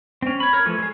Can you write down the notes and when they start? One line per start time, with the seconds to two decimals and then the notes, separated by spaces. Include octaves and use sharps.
0.22 C4 C#4
0.40 C#5 B5
0.53 A#4 C#5
0.65 E3 F3 A3
0.79 G#3 G#4